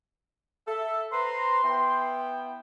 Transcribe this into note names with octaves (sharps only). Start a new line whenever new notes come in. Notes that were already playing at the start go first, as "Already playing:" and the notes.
A4 E5
B4 C5 A#5 C6
B3 E4 G5